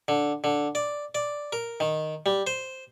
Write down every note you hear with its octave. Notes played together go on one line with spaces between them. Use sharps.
D3
D3
D5
D5
A#4
D#3
G3
C5